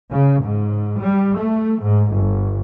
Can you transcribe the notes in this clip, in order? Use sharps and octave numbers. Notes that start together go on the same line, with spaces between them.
C#3
G#2
G3
A3
G#2
G1